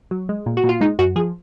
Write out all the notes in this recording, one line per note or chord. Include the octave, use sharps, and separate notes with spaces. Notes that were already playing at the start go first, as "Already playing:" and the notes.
F#3
G#3
A#2
F#4
A#2
F4
G#3 D#4
F#2 F#4
F3 G#4